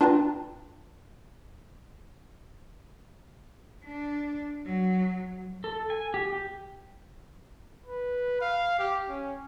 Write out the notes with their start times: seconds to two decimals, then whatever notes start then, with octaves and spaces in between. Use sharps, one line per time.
0.01 D4 F4 B4 G5 A5 A#5
3.85 D4
4.66 F#3
5.64 A4
5.90 G#5
6.14 G4
6.33 G4
7.86 B4
8.41 F5
8.79 G4
9.08 C#4